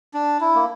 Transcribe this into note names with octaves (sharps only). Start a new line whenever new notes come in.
D4
E4
A#3